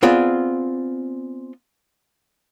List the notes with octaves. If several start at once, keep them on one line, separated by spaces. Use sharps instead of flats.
B3 C4 F4 G#4 D5